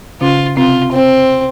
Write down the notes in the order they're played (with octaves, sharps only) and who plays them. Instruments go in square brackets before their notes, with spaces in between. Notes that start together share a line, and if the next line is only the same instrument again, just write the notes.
[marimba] C#3 C#4 [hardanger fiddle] F4
[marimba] C3 C4 [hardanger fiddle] F4
[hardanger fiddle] C4